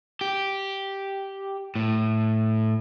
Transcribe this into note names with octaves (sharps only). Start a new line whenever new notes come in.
G4
A2